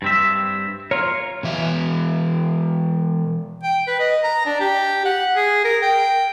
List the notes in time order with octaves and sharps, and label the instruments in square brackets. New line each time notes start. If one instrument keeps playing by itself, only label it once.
[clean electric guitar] G2 C4 E5
[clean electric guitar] F4 A#4 [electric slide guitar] C#5
[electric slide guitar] B2 E3 E5
[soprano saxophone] G5
B4
D#5
A#5
D4
G4
F#5
G#4
A#4
G5